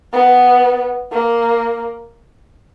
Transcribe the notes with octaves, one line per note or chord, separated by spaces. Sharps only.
B3
A#3